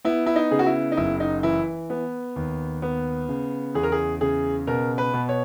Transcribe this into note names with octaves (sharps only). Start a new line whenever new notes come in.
B3 E4
E4
D#4
C#3 G#4
F#4
E4
D#4
F#1 E4
D#4
E3 E4
B3
D#2
B3
C#3
E2 G#4
A#4
G#4
C#3 G#4
B2 A#4
B4
B2
C#5